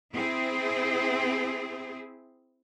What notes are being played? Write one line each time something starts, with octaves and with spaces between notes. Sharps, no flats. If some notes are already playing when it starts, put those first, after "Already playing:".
C4 E4 G#4